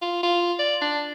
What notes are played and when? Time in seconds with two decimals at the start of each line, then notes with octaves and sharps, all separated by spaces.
0.02 F4
0.23 F4
0.59 D5
0.81 D4